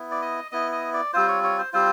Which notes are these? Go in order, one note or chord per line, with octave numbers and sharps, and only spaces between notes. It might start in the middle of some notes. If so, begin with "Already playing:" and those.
Already playing: B3 E4
D5
D#5
B3 E4 D#5
D#5
D5
G3 C4 F4 C5
C#5
C#5
C5
G3 C4 F4 C5